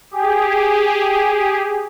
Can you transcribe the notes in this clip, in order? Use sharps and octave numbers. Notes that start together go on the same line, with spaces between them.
G4 G#4